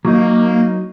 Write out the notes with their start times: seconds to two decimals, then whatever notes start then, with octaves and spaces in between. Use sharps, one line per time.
0.05 F#3 A#3 D#4